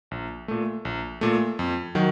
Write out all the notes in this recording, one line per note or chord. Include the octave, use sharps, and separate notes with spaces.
A#1
A#2 A3
A#1
A#2 A3
F2
D#3 F#3